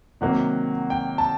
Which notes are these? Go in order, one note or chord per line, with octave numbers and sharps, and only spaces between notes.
C3 D#3 F#3 A#3 F#5
G5
A5